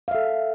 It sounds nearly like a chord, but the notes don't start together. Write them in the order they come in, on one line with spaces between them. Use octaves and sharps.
F5 E5 A4